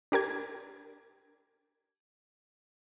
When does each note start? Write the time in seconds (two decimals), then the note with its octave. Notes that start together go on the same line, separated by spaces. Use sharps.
0.12 D4 G4 A#4 G#6